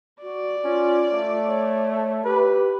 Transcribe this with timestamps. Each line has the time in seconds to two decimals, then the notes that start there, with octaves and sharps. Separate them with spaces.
0.23 F#4 D5
0.64 C#4 F4
1.12 A3
1.47 C#5
2.25 G4 B4